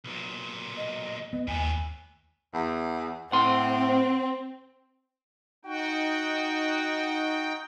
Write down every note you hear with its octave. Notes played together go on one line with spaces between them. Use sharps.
B1 A#2
D#5
B3 D#5
D#2 A2 B3 G#5
E2
A2 C4 F#5 C6
D#4 F#4 G5